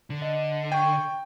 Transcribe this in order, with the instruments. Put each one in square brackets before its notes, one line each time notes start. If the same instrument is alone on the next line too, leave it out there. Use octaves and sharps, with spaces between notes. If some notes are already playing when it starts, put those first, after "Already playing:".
[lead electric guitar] D3
[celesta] D#5
[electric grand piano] G5 [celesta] C#6 G#6